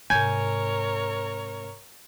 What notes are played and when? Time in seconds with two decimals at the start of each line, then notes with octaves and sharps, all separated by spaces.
0.10 G#2 C3 A#4 C#5 G#5 G6 G#6